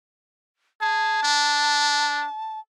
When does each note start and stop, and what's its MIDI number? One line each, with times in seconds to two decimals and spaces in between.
0.81 1.20 68
0.81 2.59 81
1.23 2.26 62